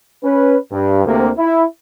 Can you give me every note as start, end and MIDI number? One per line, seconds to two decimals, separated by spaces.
0.24 0.56 61
0.24 0.56 71
0.72 1.04 43
1.05 1.29 38
1.05 1.29 48
1.05 1.29 58
1.37 1.64 64